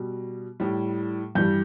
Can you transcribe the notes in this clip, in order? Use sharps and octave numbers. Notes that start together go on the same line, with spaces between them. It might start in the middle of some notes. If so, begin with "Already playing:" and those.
Already playing: B2 G3
A2 G3
G2 E3 G3 G6